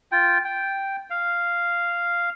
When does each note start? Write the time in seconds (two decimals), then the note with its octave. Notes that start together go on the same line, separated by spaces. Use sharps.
0.12 F4 G5
0.44 G5
1.10 F5